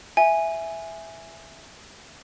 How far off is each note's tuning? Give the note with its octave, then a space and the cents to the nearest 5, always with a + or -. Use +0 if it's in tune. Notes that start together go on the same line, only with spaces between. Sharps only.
E5 +0 G#5 +0